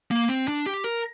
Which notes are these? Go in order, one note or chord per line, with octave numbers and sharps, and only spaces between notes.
A#3
C4
D4
G4
A#4